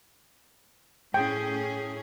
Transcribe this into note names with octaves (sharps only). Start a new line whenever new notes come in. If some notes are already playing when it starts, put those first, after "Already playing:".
A2 C#4 G#4 G5